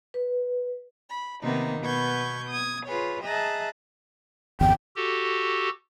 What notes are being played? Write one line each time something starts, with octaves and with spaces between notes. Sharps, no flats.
B4
B5
C3 D#3 A#3 B3 D#4
B2 B3 B4 C#6 G6 G#6
D#6 G#6
F4 G#4 B4 C#5
G#4 D#5 E5 A5 A#5 F#6
G1 E2 G5
F#4 G4 A4